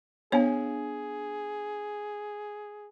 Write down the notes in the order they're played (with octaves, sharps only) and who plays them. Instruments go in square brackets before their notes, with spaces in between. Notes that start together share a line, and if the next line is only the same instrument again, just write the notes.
[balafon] B3 C#5 [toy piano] D4 F5 G#5 [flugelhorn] G#4